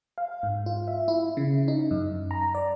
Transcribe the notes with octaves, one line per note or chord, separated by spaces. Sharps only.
F5
G#2
F4
E5
E4
C#3
D#4
F#2
A#5
D5